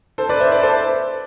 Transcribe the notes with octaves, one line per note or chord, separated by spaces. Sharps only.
A4 C5
B4 D5
C5 E5
B4 D5
A4 C5